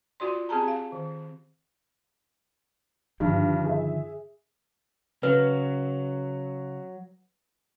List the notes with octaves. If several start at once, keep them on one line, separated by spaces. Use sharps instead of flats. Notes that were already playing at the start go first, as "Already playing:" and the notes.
F4 F#4 D5 C6
C4 G4 G#4 A5 A#5
F5
D#3
G2 D3 D#3 F3
G#4 E5
C#3 F#3 B4